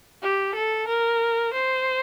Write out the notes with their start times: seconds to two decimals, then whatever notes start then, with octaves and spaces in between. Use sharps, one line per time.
0.23 G4
0.55 A4
0.88 A#4
1.54 C5